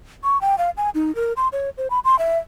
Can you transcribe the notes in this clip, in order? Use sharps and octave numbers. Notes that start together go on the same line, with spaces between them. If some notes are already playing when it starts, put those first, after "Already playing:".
C#6
G5
F5
G#5
D#4
A#4
C6
C#5
C5
B5
C6
E5